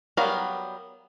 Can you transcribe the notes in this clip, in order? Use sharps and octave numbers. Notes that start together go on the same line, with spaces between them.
F#3 G3 B3 A#4 F5